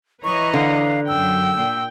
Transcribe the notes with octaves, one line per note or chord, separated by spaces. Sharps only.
E3 B4 C#5 D#5 A#5 C#6
D3 F5
F#2 G5 E6
A#2 G5